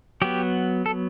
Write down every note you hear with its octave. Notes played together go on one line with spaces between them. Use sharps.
F#3 B3 G4
A4